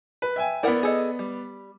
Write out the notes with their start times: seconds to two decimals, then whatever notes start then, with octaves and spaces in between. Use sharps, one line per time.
0.22 B4
0.36 E5 G5 G#5
0.63 B3 E4 A#4 D5 F#5
0.83 G#4 A4 D#5
1.19 G3